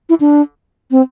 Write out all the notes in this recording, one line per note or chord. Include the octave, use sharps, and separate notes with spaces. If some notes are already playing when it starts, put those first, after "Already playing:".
E4
D4
C4